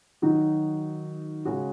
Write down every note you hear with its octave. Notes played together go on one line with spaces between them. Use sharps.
D#3 F#3 D#4 F#4
C#3 G#3 C#4 F#4